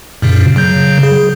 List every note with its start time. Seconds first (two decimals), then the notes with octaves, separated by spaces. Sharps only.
0.22 F#2 A#2 C#3
0.56 C#3 F#3 G6
1.03 G#4